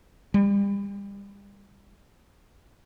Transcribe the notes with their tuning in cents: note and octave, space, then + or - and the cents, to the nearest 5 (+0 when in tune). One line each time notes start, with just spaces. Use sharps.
G3 +35